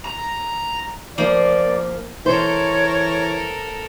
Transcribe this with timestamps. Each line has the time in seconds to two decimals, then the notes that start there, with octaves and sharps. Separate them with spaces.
0.05 A#5
1.18 F3 A#3 D5
2.26 E3 A4 A#4 C5 C#5